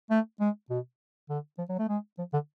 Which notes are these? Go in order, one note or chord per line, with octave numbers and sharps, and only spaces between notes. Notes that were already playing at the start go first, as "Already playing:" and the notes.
A3
G#3
B2
D3
F3
F#3
A3
G#3
F3
D3